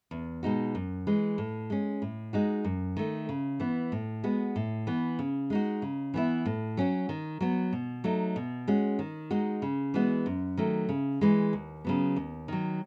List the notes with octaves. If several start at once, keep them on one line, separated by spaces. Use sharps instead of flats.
E2
B2 G#3 D#4 F#4
F#2
E3 G#3
A2
G#3 C#4
A2
G#3 D#4 F#4
F#2
D#3 A3
C#3
E3 B3
A2
G#3 B3 F#4
A2
E3 B3
C#3
G#3 D#4 F#4
C#3
E3 B3 E4
A2
F#3 C#4 F#4
D#3
F#3 B3 F#4
B2
F#3 A3 D#4
B2
G#3 C#4 F#4
D#3
G#3 D#4 F#4
C#3
E3 G#3 B3 F#4
F#2
D#3 F#3 A3
C#3
E3 G#3
D#2
C#3 F#3 B3
D#2
D#3 F#3